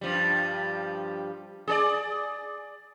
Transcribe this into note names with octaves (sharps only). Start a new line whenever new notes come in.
G2 F3 G3
G#4 A4 D5